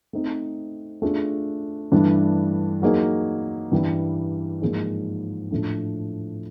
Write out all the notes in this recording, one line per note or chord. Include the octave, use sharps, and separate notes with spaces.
A3 C4 D#4
A3 D4 F4 G#4
G2 E3 A3 D4
F#3 A#3 D#4 G#4
G2 E3 G3
G#2 F3 A#3 D#4 G#4
A2 F3 A3 D4